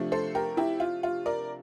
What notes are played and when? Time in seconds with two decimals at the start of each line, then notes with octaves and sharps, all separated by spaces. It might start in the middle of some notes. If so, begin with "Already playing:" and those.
Already playing: C3 F3 A3 D4
0.12 A4 C5
0.35 G4 A#4
0.57 E4 G4
0.80 F4
1.03 F4
1.26 A#4 D5